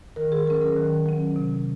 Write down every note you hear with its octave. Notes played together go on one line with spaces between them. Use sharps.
D#3 A#4
G#4
F#3 C#4 A#4
A#4
D#3
F#3 C#4
C3